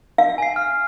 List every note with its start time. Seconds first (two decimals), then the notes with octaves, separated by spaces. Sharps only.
0.18 F5
0.38 G#5 C7
0.56 F6